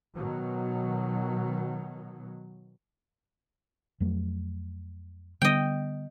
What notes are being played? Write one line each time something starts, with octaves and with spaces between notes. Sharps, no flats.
B2 D#3 F#3
F2 F#3 A3
D3 G3 B3 D#5 G5